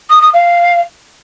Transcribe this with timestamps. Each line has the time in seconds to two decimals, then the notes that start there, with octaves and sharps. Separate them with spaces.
0.09 D#6
0.21 D#6
0.33 F5